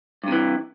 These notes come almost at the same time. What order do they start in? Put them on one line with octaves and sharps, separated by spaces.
G2 C3 E3